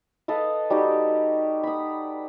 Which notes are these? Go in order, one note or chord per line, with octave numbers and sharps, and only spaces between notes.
A4 B4 D#5 F5
G3 D#4 F#4 G4
B5 D#6